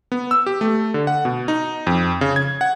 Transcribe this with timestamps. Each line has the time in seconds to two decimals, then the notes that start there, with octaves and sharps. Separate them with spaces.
0.12 B3
0.31 E6
0.46 G4
0.61 A3
0.94 D3
1.07 F#5
1.25 B2
1.48 D#4
1.87 F2
2.21 C#3
2.36 G#6
2.61 F#5